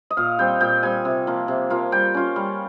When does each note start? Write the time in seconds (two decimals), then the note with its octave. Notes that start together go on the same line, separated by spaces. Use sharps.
0.10 D#5
0.17 A#2 F5
0.39 G3 C4 G5
0.61 A#2 G5
0.83 G3 C4 G#5
1.05 C3
1.27 F3 A#3 F4
1.48 C3
1.70 F3 A#3 F4
1.92 G3 G5
2.14 C#4 F4
2.36 G3